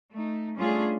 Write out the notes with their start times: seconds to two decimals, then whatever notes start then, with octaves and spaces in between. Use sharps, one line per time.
0.13 A3 D#4
0.57 G3 A3 C#4 D4 F4 G#4